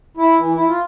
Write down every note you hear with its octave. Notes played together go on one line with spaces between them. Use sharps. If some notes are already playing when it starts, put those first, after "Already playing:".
E4
E3
E4
F4